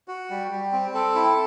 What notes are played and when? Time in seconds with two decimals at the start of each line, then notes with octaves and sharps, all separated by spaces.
0.08 F#4
0.30 G3
0.51 G3
0.72 C4
0.94 A4
1.15 E4